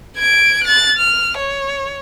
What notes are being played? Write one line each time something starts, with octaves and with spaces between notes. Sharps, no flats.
G#6 D7
F#6 A6
F6
C#5